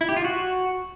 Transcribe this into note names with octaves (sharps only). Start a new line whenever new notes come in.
E4
G4
F4
F#4